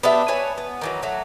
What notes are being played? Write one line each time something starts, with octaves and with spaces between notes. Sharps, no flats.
B3 D4 G4 E5
B4 C#5 G#5 A5
B3
D#3 E3 F#3
F#3 A3